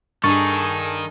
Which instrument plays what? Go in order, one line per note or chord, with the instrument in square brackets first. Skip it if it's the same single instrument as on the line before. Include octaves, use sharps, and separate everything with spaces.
[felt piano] G2 [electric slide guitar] D#3 D#4 [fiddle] G#4 A4 [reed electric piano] C#6 A6